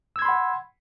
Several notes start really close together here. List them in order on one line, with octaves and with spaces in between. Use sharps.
E6 G#6 C6 B5 F#5